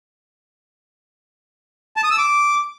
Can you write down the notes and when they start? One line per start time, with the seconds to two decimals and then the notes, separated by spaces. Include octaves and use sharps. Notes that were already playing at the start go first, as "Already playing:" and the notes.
1.97 A5
2.04 D#6
2.11 E6
2.18 D6